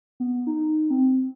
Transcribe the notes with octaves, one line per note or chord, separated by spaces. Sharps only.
B3
D#4
C4